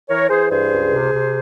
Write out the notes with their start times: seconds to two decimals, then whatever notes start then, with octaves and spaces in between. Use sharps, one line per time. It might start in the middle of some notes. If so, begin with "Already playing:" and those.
0.09 E3 A#4 C#5
0.29 E3 G#4 C5
0.50 G2 G#4 C5
0.71 C#2
0.92 C3
1.12 C3